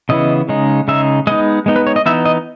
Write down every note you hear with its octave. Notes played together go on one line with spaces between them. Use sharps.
C#3 E3 B3 E4 D#5
C#3 G#3 D#4
C#3 G#3 D#4 E5
G#3 B3 D#4 D#5
G#3 B3 D#4
B4
C#5
D#5
E3 B3 D#4 E5
D#5